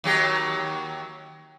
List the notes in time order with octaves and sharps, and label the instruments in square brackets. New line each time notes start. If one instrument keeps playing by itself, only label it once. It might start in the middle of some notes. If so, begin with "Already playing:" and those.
[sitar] D#2 F#3 G4